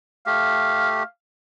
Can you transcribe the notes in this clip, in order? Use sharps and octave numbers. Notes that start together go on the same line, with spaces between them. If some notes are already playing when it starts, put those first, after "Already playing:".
A3 G4 F5